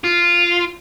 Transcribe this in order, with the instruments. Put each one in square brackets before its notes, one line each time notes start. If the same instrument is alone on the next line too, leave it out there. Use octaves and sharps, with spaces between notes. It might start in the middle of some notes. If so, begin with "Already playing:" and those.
[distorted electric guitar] F4